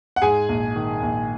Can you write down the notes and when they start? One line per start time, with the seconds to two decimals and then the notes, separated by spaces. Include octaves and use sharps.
0.16 F#5
0.22 G#2 G#4 G#5
0.49 A#1
0.76 D#3
1.03 A#1